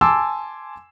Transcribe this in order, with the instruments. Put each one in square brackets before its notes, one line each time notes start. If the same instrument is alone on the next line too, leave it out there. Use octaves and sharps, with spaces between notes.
[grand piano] G#5 A5 C6 D6 E6